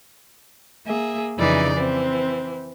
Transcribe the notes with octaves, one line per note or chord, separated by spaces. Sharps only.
A#3 G#4 E5
F2 C#3 E3 D#4 D5
E3 C4